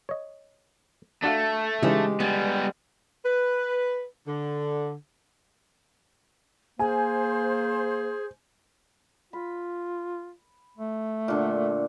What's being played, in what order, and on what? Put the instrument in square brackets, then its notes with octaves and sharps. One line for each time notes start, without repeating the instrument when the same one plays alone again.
[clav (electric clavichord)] C#5 D#5
[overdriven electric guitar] A3 [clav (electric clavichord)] D4 F#4 F5
[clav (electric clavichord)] C#3 E3 D#4 [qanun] G#3 G4
[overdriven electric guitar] G3 B3 [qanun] G#5
[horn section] B4
D3
[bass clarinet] A#3 [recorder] G#4 [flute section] C5 [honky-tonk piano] G#5
[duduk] F4 [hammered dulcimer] B5
[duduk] A3
[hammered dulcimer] A#2 D3